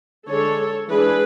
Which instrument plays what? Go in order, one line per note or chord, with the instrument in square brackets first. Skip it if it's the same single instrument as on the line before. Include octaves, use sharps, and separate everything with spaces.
[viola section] D3 G#3 D4 A4 C#5
E3 G#3 D4 G#4 B4